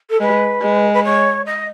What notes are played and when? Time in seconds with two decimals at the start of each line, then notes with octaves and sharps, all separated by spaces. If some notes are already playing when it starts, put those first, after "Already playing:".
0.10 A4
0.20 G#3 B4
0.62 G#3
0.93 B4
1.04 C#5
1.46 D#5